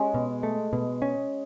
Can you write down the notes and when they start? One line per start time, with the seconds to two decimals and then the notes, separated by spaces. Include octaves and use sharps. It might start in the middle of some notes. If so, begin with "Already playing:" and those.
Already playing: G#3 C#4
0.14 B2
0.43 A3
0.73 B2
1.02 C#4